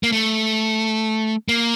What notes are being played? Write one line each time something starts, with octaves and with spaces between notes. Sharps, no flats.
A#3
A3
A#3